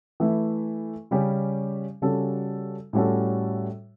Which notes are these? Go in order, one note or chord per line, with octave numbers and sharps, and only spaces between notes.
E3 A3 E4
C#3 G3 C#4 G4
C#3 G3 C#4 F#4 A4
A2 G3 C#4 F#4 A4